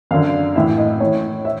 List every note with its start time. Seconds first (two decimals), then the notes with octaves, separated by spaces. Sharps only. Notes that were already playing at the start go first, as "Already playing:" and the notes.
0.11 F#2 D3 F5
0.55 A2 E3 E5
0.78 D#5
1.00 A2 E3 C#5
1.45 E5